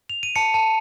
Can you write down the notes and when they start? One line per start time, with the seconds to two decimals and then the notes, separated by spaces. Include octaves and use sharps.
0.10 F7
0.23 D#7
0.36 A5 C#7
0.54 A5